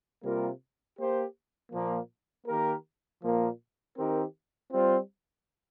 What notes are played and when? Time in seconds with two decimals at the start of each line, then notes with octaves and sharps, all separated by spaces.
0.23 C3 G3 A#3 F4 A#4
0.97 A#3 G4 C5
1.72 A#2 F3 A#3
2.47 D#3 A#3 G4 A#4
3.21 A#2 F3 A#3
3.96 D#3 C4 D#4 G4 A#4
4.72 G3 C4 F4 C5